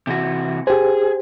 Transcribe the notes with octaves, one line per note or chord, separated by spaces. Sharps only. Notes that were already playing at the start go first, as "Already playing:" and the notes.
C3 E3 F#4
G4 G#4 C5